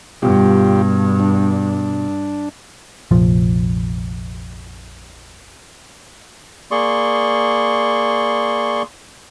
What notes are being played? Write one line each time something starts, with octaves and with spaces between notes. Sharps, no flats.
G2 B2 G3 F4 G4
D4
F1 A#1 F3
A#3 G#4 D5 C6 C#6